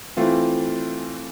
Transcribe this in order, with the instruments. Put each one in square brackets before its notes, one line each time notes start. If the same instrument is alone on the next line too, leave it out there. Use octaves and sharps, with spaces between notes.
[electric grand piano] E3 A3 C4 F4